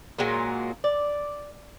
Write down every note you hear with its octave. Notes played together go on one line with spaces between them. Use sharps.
A#2 F#3 G#3 A#3
D5